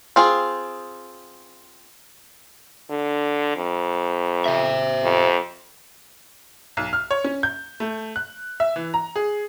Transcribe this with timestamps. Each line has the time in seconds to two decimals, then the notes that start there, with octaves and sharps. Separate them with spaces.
0.16 C4 F4 G#4
2.90 D3
3.56 F2
4.46 C5 E5
5.03 F2
6.77 B1
6.93 F6
7.11 C#5
7.24 C#4
7.43 G6
7.80 A3
8.16 F#6
8.60 E5
8.76 E3
8.94 A#5
9.16 G#4